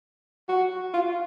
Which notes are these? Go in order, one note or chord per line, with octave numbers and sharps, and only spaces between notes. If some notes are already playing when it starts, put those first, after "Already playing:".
F#4
F4